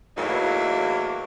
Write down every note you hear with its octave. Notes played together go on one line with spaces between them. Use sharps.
E2 A2 E3 F#3 A#3 D#4